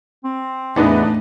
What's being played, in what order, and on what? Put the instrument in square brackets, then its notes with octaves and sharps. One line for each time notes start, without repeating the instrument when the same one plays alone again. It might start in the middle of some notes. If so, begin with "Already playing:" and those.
[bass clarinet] C4
[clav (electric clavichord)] E2 B3 D#5 [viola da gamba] A2 [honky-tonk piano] D4 D#4 B4